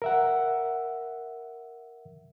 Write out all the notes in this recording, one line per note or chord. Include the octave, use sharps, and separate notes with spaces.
A#4 E5 F#5